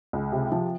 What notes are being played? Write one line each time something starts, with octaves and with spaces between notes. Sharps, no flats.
C#2
C3
F3